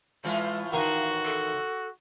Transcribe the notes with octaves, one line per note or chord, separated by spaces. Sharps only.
A2 E3 G#3 F4
D#3 D#4 F#4 F5 G#5
A4